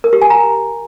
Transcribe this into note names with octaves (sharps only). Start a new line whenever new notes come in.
A#4
G4
G#5
A#5